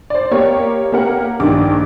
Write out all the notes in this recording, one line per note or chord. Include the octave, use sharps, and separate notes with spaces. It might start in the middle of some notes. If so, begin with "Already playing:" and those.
C5 D5
A#3 G4 C#5
A#3 G4 A#4 F#5
A#1 G2 D#3 G4 D6